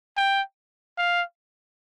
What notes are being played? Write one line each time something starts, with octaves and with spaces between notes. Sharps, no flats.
G5
F5